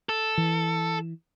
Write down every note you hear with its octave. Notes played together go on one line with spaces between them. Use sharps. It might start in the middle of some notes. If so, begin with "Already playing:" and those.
A4
E3